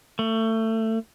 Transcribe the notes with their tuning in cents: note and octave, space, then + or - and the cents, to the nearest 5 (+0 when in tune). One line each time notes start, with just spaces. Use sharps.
A3 +25